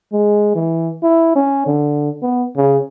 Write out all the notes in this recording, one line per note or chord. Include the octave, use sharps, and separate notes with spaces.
G#3
E3
E4
C#4
D3
B3
C#3